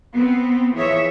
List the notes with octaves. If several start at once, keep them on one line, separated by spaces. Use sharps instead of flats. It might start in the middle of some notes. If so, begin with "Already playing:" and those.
B3 C4
E3 F3 G#4 C#5 E5